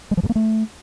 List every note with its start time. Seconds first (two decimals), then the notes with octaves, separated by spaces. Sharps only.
0.11 G#3
0.17 F3
0.23 G2
0.29 A#3
0.35 A3